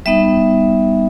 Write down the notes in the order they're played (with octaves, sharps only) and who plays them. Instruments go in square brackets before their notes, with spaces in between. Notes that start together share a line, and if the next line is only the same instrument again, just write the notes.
[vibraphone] G3 B3 D#4 E5